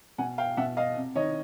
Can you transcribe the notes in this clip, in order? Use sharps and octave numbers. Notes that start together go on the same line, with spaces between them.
B2 F#5 G#5
F5 G5
B2 E5 F#5
D#5 F5
C3
D#3 C#5 D#5